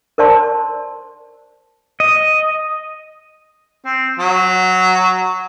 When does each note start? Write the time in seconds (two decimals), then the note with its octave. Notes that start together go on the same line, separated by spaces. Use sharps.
0.18 A#4 C5 D5 A5 C6
2.00 D#5
3.86 C4
4.19 F#3